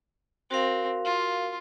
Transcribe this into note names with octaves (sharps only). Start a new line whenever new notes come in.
C4 F#4 A#4 F5
F4